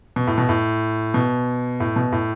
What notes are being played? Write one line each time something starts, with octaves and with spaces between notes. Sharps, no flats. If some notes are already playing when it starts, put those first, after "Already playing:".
B2
A2
B2
A2
B2
A2
B2
A2